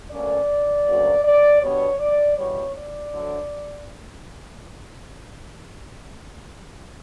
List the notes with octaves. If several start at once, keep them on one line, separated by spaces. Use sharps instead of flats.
D2 D3 A#3 C#4 D5
D2 C#3 F#3 A#3
D5
B2 G3 B3 D4 C#5
D5
E2 B2 G3 C#5
D5
D2 D3 F#3